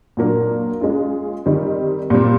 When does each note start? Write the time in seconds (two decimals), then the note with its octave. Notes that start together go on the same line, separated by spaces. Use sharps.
0.17 A#2 F#3 A#3 D4
0.81 G#3 C#4 F4
1.46 D#3 G3 C4 D#4
2.10 A#2 G3 C4